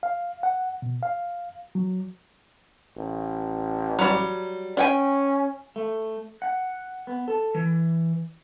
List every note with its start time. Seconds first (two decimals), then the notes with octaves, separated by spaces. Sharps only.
0.03 F5
0.43 F#5
0.82 B2
1.03 F5
1.75 F#3
2.96 A1
3.99 F#3 G3
4.77 C#4 D4 G5 G#5
5.76 A3
6.42 F#5
7.07 B3
7.28 A4
7.55 E3